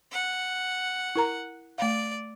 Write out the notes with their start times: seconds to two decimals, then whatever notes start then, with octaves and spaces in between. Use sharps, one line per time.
0.12 F#5
1.15 E4 A#4 A#5
1.78 A3 D5 F5